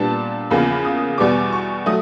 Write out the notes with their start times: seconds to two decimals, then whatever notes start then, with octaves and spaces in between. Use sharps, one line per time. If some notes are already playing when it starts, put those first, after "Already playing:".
Already playing: A#2 G3 B3 D4 A5
0.51 E2 C#3 F3 A#3 B5
0.85 D#6
1.18 E2 B2 G3 B3 D6
1.52 C#6
1.86 F#3 A3 D#6